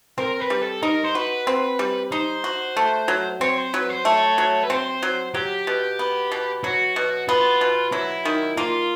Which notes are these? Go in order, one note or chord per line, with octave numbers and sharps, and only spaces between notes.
C4 A#4
B4
G3
A4
D#4 A#4
C5
F#4 B4
C4
G3
D#4 C5
F#4
A3
F#3
C4 C#5
C5
F#3 B4
C5
A3 C#5
F#3
B4
C4 C5
F#3
F#3 G4
B2
B3
B2
F#3 F#4
B2
B3 F4
B2
F#3 E4
D#3
A#3 F4